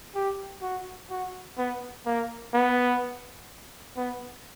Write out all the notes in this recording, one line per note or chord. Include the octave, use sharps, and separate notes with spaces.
G4
F#4
F#4
B3
A#3
B3
B3